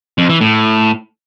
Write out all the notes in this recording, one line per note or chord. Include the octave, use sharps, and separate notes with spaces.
F2
E3
A2